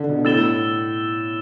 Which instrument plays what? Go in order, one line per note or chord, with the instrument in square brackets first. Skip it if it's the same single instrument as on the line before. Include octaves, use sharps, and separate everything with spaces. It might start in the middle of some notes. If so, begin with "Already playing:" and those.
Already playing: [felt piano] D3
B2
[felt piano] A2 [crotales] E6 A6 E7 G7